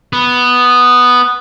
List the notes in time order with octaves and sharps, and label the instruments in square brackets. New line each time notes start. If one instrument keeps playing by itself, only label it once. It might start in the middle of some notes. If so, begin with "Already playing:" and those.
[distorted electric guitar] B3